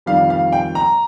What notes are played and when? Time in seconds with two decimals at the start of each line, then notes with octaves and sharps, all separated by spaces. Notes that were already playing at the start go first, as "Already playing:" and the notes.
0.06 F2 D#3 G3 F5
0.30 F5
0.52 G5
0.75 A#5